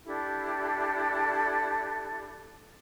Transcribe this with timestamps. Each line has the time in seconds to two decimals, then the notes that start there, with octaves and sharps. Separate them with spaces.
0.06 D4 E4 G4 A4